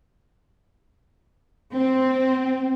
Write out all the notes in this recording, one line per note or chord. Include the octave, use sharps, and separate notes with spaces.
C4